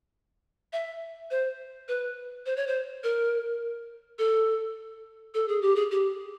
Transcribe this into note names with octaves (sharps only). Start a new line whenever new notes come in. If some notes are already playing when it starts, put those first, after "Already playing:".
E5
C5
B4
C5
C#5
C5
A#4
A4
A4
G#4
G4
G#4
G4